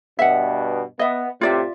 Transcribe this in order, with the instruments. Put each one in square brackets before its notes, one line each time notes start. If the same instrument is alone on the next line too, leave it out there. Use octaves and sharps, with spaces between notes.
[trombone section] G2 B2 [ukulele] E5 F#5
[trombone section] B3 [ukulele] D#5 E5
[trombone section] A2 C3 [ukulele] F4 D5 E5